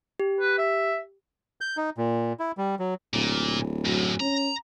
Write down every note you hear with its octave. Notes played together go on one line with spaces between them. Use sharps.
G4
B4
E5
G6
D#4
A#2
E4
G3
F#3
D1 A#2
F#2 A2 F#3
C#4 A#5